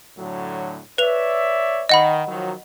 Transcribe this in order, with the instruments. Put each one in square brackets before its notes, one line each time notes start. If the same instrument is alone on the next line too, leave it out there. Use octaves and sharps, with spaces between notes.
[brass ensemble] A2 D3 F#3
[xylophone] B4 F7 [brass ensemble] C#5 D5 E5
[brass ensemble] D#3 [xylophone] D#5 F#5 B5
[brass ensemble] D#3 F3 F#3